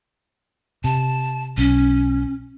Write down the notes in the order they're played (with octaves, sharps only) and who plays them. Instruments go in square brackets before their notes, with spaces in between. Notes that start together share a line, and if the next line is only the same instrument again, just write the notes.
[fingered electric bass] C3 [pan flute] A5
[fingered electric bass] B1 [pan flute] C#4